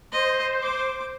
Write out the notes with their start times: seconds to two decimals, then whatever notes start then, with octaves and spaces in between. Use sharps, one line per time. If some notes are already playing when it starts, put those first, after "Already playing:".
0.12 C5 D#5
0.62 D6